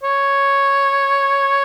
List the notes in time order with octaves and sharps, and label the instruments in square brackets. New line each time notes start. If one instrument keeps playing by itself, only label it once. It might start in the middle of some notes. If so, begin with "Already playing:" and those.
[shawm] C#5